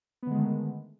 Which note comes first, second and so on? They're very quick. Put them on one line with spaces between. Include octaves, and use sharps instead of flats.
B3 D3 G#3 D#3 A3